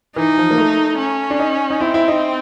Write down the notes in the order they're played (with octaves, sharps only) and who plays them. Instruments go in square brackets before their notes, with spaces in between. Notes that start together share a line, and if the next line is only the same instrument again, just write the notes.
[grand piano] E3 [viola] D#4
[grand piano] F3
A#3
A3
[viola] C#4
[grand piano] D4
D#4
D#4
[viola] C4 [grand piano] E4
[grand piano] E4
D#4